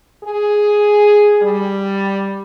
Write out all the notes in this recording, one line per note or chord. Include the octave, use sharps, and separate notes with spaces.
G#4
G3